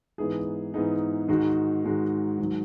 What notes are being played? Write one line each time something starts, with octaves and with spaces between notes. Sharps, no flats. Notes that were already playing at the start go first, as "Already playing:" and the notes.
G#2 E3 B3 D#4 G#4
G#2 E3 B3 D#4 G#4
G#2 D#3 G#3 D#4 F#4
G#2 D#3 G#3 D#4 F#4
G#2 D#3 F#3